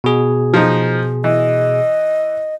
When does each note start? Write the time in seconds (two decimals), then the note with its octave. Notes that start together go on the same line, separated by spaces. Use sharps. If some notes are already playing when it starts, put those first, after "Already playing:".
0.04 B2 G#4
0.54 F3 D#4
1.24 E3 D#5